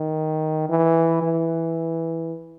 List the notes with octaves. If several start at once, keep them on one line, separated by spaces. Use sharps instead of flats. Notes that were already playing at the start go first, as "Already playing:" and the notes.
Already playing: D#3
E3
E3